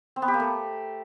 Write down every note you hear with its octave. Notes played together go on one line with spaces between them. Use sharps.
C4
B3
G4
A#3
A3